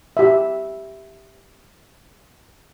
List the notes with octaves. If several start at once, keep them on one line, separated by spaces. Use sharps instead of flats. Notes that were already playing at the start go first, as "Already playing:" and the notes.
G4 E5